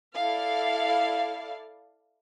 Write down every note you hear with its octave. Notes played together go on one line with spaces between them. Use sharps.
E4 A4 D5 F5